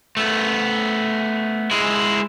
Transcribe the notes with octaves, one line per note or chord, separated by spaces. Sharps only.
A3 B3
G#3 E4